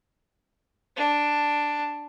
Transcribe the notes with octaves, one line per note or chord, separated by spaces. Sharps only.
D4